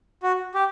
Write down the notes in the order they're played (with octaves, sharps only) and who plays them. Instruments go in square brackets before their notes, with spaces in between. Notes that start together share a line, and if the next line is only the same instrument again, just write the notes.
[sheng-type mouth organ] F#4
G4